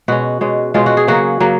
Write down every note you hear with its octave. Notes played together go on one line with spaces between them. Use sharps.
B2 G#3 C#4 F#4
B2 G#3 C#4
B2 G#3 C#4 F4
F#4
G#4
C#3 F#3 A#3 F#4
C#3 F#3 A#3